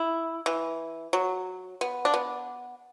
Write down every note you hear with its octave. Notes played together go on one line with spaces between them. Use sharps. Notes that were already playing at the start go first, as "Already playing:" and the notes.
Already playing: E4
E3
F#3
B3
D4
B3